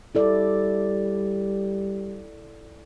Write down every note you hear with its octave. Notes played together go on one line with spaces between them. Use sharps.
G3 E4 A4 D5